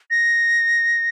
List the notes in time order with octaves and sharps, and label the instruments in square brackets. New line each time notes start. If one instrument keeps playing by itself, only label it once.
[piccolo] A#6